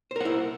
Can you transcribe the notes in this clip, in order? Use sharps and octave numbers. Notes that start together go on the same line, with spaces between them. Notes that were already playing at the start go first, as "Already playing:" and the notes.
E4 A#4 C5 F#5